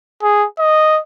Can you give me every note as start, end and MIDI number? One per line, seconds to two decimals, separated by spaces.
0.23 0.46 68
0.59 0.99 75